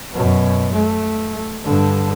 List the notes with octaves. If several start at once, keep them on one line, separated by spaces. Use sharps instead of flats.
F#2 B2
A3
G2 D3